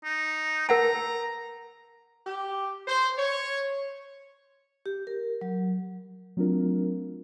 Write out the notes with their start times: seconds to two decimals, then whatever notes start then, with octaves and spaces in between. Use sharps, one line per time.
0.04 D#4
0.69 A#4 F#5 A5 A#5
2.27 G4
2.88 C5
3.17 C#5
4.86 G4
5.07 A#4
5.41 F#3
6.37 F#3 A3 C4 D4 F4 A#4